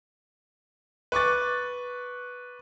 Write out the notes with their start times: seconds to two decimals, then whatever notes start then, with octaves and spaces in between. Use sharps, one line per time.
1.12 B4 C#6 D6 A6